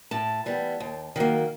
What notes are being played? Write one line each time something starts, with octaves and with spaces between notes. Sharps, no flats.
A2 A5
E3 G3 B3
D#2
D#3 F#3 A#3